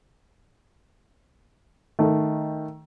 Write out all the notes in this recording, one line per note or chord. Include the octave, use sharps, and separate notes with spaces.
D#3 A3